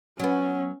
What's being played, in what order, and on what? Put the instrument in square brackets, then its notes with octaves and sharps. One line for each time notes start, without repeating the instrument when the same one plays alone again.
[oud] F#3 B3 [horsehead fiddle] C#4